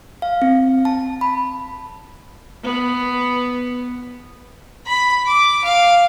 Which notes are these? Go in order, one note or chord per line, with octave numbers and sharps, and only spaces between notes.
F5
C4
A5
B5
B3
B5
D6
F5